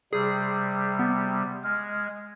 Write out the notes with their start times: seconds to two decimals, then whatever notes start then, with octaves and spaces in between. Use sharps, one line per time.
0.13 C3 G3 G#4
0.99 B3
1.64 G#3 F6